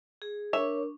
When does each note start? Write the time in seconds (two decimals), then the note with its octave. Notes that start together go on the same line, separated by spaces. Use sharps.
0.22 G#4
0.53 D4 A#4 C#5 E5 C#6